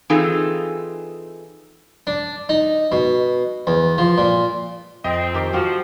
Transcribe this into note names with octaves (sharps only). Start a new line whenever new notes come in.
E3 C4 D#4 F4 G#4 A4
D4
D#4
B2
E2
F3
A#2
F2 C4 D#5 G5
D#3 G4 D6
F3 F#4 F#5